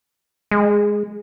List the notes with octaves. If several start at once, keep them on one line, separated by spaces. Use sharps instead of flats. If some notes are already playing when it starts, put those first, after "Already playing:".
G#3